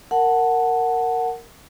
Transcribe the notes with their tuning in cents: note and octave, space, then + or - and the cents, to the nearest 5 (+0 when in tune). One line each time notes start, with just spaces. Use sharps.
A#4 -10 F#5 +0 A5 +5